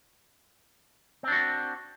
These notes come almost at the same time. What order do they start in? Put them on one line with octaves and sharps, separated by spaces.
C4 D4 F#4